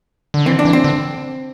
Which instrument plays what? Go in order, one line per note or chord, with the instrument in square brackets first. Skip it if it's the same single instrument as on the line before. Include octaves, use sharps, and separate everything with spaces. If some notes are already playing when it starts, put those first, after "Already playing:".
[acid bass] D3
[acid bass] E3 [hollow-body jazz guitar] C4
[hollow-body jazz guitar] D4
[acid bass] E3
[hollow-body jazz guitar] C4
[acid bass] D3